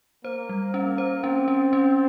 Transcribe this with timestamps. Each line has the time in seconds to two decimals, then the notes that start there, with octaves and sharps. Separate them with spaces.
0.25 A#3 C5
0.49 G3
0.74 C#4
0.98 C5
1.24 C4 C#4
1.48 C#4
1.73 C#4